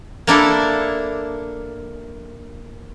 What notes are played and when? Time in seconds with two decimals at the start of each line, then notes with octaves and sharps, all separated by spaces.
0.27 A#3 D4 E4 A4